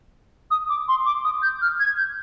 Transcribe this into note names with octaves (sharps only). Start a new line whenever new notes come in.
D#6
D6
C6
D6
D#6
G6
F6
G#6
G6